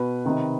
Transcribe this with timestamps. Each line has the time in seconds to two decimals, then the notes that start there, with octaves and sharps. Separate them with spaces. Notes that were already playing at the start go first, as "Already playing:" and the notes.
Already playing: B2 B4
0.26 C3 D#3